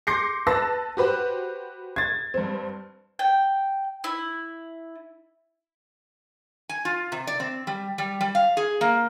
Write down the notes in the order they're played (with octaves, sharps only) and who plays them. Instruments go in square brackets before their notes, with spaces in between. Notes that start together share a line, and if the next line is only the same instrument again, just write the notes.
[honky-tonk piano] C6 D6 G6 A#6 C7 C#7
B4 A5 E6 A#6
F#4 G4 B4 C5
G#6 A6
G2 C4
[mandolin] G5
E4
[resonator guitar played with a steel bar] G#5
F4
C3
D5
C4
G3
G3
G3
F5
G#4
A#3